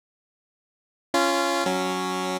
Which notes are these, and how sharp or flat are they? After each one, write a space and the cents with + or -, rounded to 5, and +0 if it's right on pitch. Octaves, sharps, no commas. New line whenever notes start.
C#4 +0 F4 -20
F#3 +0 C#4 +0